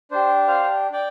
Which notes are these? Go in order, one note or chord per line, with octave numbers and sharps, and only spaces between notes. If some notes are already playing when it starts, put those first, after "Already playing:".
D4 G4 C5
C5 F5
D5 G5